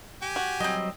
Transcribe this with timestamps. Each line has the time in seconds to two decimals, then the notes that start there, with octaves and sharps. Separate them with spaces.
0.22 G4 G#5
0.36 F#4
0.60 F#3 G3 C4 D#5